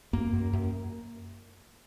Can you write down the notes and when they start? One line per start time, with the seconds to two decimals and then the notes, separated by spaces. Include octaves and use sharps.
0.13 F#2 A#3
0.33 F#2
0.53 F#2